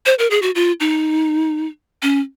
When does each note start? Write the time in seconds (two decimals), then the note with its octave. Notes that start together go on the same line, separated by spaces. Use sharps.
0.06 C5
0.19 A#4
0.31 G#4
0.42 F#4
0.55 F4
0.80 D#4
2.02 C#4